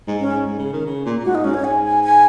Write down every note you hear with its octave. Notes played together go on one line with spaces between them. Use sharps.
G#2
C#4
G#2
G#2
C#3
D#3
C#3
A#2
A#2
G#2 F#4
D#4
G#2 C#4
C#5
G#2 G#5
G#5
G#5